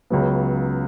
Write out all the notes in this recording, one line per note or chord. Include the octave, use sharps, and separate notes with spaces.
C#2 C#3 F#3 B3